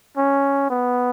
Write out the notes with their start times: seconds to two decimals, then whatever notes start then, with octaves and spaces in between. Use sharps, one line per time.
0.17 C#4
0.70 B3